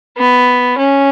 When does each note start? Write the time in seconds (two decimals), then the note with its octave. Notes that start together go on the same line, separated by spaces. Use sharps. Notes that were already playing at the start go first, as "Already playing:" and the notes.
0.17 B3
0.78 C#4